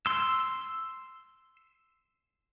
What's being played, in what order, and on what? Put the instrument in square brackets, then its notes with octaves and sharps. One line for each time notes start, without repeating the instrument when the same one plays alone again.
[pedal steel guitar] C6 E6